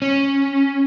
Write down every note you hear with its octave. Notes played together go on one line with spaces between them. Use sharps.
C#4